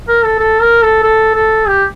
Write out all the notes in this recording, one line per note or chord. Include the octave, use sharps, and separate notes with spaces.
A#4
A4
A4
A#4
A4
A4
A4
G4